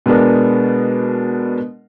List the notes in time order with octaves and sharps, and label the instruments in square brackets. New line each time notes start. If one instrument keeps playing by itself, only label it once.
[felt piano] B2 G#3 B3 D4 A#4